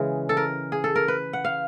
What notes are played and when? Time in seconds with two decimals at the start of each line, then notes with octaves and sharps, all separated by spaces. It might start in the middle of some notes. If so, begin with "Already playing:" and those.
Already playing: C#3 E3 G#3 G#4
0.29 A4
0.37 A#4
0.72 G#4
0.84 A4
0.96 A#4
1.08 B4
1.33 F#5
1.45 F5